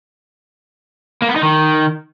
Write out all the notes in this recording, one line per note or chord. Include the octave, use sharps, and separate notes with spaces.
A#3
B3
D#4
D#3